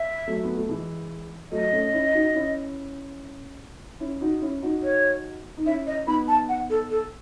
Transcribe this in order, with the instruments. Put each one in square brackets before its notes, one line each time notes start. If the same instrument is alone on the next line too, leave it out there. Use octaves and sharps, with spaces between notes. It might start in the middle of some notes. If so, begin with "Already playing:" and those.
Already playing: [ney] E5
[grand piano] F#3 A3
B3
A3
E3 G#3
[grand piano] F#3 A3 [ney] D#5
[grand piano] A3 C#4
C#4 E4
D#4 F#4
C#4 E4
C#4 E4
D#4 F#4
C#4 E4
D#4 F#4
[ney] C#5
[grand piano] D#4
[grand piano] C#4 E4 [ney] E5
[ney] D#5
[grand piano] B3 D#4 [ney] B5
[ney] A5
F#5
A4
A4